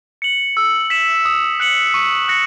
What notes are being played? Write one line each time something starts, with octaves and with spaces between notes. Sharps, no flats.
C#7 F#7
E6
B6 E7
D#6
F#6 C#7 F#7
C#6
F#6 A#6 C#7